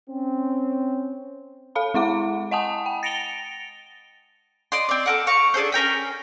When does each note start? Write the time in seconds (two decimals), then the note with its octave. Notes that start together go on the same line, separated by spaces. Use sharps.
0.10 C4 C#4
1.75 A4 F5 B5
1.94 G#3 E4 F#5 D6
2.51 D#5 F#5 G#5 A5 D#6
2.86 G5
3.03 A6 A#6 C#7 D7 F7 G7
4.72 D5 D#5 C6
4.89 C4 D5
5.06 A4 A#4 F#5
5.27 F5 A#5 C#6
5.54 D4 G#4 A4 C5
5.72 C#4 A#4 G5 B5